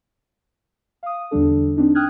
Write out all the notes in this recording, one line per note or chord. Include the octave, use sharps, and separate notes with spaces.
F5 D#6
E2 D3 G3 D4 A4
C4 D4 D#4
G5 D#6 F6 F#6 G#6